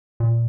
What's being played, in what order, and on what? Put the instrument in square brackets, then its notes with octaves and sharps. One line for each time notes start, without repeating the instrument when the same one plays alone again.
[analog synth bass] A#2